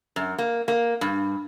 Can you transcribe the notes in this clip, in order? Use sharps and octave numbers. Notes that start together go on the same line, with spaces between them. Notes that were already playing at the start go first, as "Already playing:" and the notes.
F#2
A#3
A#3
G2